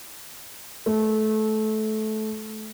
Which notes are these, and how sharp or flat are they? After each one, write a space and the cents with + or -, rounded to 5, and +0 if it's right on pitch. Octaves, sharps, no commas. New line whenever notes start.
A3 -20